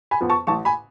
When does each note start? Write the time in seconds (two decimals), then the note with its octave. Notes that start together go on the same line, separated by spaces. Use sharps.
0.11 G#5 B5
0.21 F2 F3 B3
0.29 A5 C#6
0.47 A1 A5 C#6
0.65 G#5 B5